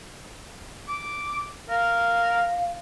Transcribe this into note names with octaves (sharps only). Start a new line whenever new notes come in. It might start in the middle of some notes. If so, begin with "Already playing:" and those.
D6
A#4 F5